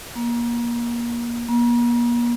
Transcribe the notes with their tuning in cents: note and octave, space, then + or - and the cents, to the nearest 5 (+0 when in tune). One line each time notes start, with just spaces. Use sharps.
A#3 +25
A#3 +40